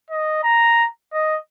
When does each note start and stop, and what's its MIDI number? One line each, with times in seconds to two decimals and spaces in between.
0.10 0.41 75
0.43 0.86 82
1.13 1.37 75